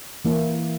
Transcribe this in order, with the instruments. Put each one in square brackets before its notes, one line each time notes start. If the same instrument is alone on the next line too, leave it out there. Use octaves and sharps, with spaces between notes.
[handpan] E3 A#3 E4